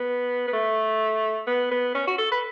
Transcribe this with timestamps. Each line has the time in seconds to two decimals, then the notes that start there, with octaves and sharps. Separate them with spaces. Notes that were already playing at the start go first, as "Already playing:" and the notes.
Already playing: B3
0.48 B3
0.53 A3
1.47 B3
1.71 B3
1.94 C#4
2.07 F#4
2.18 A4
2.31 B4